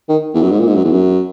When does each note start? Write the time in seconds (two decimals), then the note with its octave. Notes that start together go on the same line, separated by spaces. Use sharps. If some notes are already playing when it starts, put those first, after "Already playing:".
0.09 D#3
0.34 E2
0.42 F#2
0.51 G#2
0.59 A#2
0.68 G#2
0.75 F#2
0.84 E2
0.92 F#2